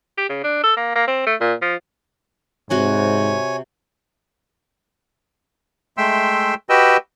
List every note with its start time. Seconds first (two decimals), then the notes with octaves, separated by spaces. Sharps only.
0.18 G4
0.29 C#3
0.44 D4
0.63 A4
0.77 A#3
0.95 A#3
1.07 C4
1.26 A3
1.41 A#2
1.62 F3
2.70 G#2 C3 F#4 C#5 G#5 C6
5.97 G#3 A3 E5 G5 C6 E6
6.69 F#4 G4 B4 D#5 G5 E6